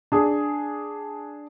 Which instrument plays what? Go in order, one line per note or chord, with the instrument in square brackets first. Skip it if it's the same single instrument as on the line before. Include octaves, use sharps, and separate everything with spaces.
[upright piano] D4 G#4